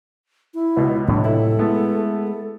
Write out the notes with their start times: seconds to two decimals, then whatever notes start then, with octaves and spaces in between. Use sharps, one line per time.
0.54 E4
0.77 C#2 B2
1.08 A2 C3 F#3 D4
1.25 E4 A4
1.59 G#3 A3 B3 E4